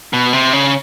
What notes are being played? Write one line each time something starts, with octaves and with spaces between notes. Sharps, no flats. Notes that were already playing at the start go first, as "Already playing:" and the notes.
B2
C3
C#3